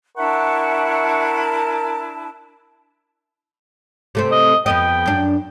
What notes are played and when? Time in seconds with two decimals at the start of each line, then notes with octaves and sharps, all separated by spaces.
0.18 D4 E4 A#4 E5 F#5 A5 C#6
4.15 C3 A3 C4
4.32 D#5
4.66 F2 B3 D#5 G5
5.06 F#2 D4